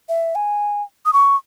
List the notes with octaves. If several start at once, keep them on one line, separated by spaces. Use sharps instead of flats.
E5
G#5
D#6
C#6